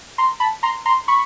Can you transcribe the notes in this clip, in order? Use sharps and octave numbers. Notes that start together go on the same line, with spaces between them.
A#5 C6
A5 B5
A#5 C6
A#5 C6
B5 C#6